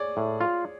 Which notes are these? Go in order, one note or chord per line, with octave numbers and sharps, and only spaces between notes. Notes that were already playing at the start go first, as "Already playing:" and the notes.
Already playing: G#4 C#5 D5
A2
F4